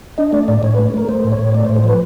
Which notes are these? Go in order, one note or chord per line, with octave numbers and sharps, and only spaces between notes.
D4 D#5
A3 D5
A2 D5
A2 C#5
A3 B4
A3 A#4
A3 C5
A2
C#5
A2
A3 D5
C5
A2
C5
F3 B4